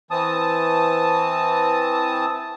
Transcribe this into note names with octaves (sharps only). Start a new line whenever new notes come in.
E3 C4 A5 D#6